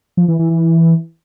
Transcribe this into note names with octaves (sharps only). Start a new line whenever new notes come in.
F3
E3
E3
E3